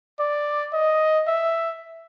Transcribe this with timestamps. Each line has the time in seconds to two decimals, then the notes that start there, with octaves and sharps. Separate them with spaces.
0.20 D5
0.73 D#5
1.28 E5